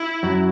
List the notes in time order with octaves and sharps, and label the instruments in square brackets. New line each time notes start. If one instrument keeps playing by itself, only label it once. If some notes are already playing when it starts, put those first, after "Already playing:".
Already playing: [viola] E4
[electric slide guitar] F#2 F#3